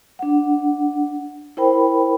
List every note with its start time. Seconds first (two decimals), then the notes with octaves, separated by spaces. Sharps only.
0.19 D4 F#5
1.57 E4 A#4 C5 G5 B5